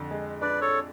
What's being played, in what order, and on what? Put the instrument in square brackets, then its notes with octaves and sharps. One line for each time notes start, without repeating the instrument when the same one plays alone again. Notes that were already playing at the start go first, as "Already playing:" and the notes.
Already playing: [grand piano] F2 D3
G#3
[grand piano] D4 [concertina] B4 D5
[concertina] A4 C#5